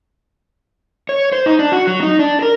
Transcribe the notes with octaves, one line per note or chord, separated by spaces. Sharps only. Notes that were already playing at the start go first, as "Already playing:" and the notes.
C#5
C5
D#4
D4
F#4
F#3
D#4
D4
A#4